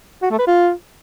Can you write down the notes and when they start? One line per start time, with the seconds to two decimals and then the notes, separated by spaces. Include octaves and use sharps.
0.22 F#4
0.31 A3
0.39 B4
0.47 F4